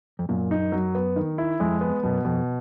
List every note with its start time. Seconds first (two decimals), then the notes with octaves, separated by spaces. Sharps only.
0.19 F2
0.29 F#2 A#2
0.51 D#4
0.72 F#3
0.95 B3
1.16 D#3
1.38 E4
1.60 F2 G#3
1.81 B3
2.03 F#2 B2
2.25 F2 B2